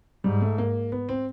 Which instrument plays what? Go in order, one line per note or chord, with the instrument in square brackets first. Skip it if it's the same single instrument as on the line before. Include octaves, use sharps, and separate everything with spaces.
[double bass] G#2 [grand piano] G3
[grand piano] A3
A#3
B3
C4